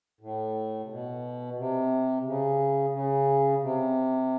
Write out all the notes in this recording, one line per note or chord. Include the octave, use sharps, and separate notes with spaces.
A2
C3
B2
C3
C#3
C#3
C3